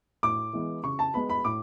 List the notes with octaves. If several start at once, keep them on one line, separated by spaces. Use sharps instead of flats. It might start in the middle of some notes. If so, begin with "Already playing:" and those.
A2 D6
E3 G#3 B3
C#3 C#6
A5
G#3 B3 B5
B5
A2 D6